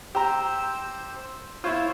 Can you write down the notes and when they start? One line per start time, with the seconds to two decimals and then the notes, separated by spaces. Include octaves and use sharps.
0.15 G4 C5 A#5 E6
1.64 E4 F4 C5 C#5